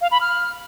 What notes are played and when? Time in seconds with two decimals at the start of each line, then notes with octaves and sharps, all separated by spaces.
0.01 F5
0.11 B5
0.21 F6